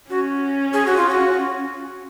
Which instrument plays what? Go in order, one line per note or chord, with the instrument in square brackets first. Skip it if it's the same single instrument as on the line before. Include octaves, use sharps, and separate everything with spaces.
[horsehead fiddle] C#4 [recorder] F#4
[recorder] G#4
F#4
F4
F#4